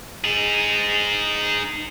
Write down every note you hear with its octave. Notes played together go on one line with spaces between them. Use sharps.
D#4 G#4